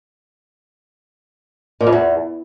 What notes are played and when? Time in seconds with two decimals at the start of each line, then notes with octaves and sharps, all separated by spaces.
1.81 A#2
1.87 F2
1.93 E2